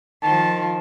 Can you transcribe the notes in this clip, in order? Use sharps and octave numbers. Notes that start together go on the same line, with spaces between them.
D#3 F3 A5